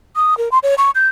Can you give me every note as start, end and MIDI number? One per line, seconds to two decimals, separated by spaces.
0.16 0.37 87
0.38 0.49 70
0.52 0.59 84
0.63 0.75 73
0.78 0.91 85
0.95 1.08 91